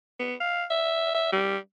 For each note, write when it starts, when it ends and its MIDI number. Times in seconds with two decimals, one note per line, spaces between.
0.19 0.34 59
0.40 0.64 77
0.70 1.14 76
1.15 1.30 76
1.32 1.57 55